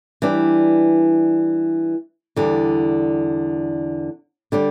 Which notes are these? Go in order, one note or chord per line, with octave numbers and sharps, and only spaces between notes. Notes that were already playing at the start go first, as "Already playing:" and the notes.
E3 G3 D4
E2 D3 G3
D3 G3 D4